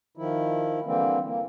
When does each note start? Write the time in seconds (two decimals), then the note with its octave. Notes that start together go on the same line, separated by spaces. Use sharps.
0.17 D#3 F3 E4
0.85 D3 E3 G3 A#3 C4
1.24 A#3